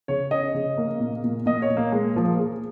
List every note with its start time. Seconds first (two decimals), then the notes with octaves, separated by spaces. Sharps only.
0.08 C#3 C#5
0.31 C#4 D#5
0.54 C#3
0.77 A#3
1.00 A#2
1.24 A#2
1.46 A#2 D#5
1.62 C#5
1.70 A#2
1.77 A#3
1.92 G#3 A#3
2.16 F3 A#3
2.39 G#4